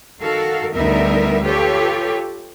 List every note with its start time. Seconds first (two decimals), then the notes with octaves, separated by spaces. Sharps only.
0.19 D#3 F#4 A4 A#4 F5
0.73 D2 G3 B3 D#4 A#4 E5
1.43 F4 G4 A4 B4 C#5